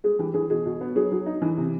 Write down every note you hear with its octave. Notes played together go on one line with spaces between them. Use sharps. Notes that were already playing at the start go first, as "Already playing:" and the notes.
G#3 G#4
E3 G4
E3 G#4
B2 G#4
B2
B3
F#3 G#4
F#3
D#4
E3
C3